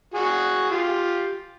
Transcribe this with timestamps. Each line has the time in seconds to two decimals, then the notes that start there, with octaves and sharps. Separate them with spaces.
0.14 F#4 G#4
0.71 F4 G4